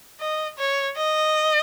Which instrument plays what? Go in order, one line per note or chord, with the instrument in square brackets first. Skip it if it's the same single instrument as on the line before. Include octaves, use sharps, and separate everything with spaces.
[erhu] D#5
C#5
D#5